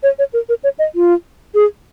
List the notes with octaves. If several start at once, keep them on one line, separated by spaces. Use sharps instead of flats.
C#5
C#5
A#4
A#4
C#5
D#5
F4
G#4